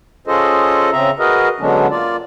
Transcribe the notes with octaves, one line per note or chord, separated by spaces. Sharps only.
C#4 F4 G#4 A4 C5 D#5
C#3 C4 E5 A#5
F#4 G#4 A#4 B4 D#5
D3 F#3 G#3 B3 C#4 D4
A#3 F4 D5